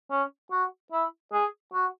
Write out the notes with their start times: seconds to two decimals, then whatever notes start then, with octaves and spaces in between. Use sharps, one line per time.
0.11 C#4
0.52 F#4
0.92 E4
1.33 G#4
1.74 F#4